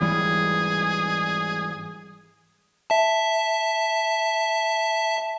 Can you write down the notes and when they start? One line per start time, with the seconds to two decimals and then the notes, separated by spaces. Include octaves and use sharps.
0.01 G#1 E3 G3 G#4
2.90 E5 A5